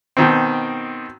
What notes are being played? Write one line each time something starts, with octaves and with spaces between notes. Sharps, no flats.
B2 D#3 C4